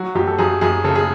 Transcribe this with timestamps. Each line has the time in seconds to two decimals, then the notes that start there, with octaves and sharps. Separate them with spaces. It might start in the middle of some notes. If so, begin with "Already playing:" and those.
Already playing: F#3 F#4
0.15 F#2 G4
0.27 A4
0.38 F#2 G#4
0.61 F#2 G#4
0.84 C#3 A4
0.95 G#4